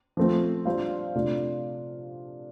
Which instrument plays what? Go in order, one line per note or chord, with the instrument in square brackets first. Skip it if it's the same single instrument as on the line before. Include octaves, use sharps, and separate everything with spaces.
[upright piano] F3 A3 C4
G3 D4 F4 C5 F5
C3 A3 D4 F4